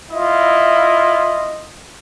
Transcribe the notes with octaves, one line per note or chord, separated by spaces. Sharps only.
E4 F4 D#5